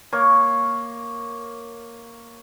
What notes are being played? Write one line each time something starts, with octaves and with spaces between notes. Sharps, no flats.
A#3 A#4 C#5 C#6